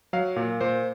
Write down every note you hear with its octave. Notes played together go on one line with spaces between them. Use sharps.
F#3 F5
A#2
A#2 C5